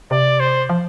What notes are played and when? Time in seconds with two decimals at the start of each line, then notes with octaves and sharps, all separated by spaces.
0.11 C3 D5
0.40 C5
0.69 F3